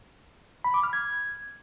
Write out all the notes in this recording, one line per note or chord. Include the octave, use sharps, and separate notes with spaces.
B5
D6
F6
G#6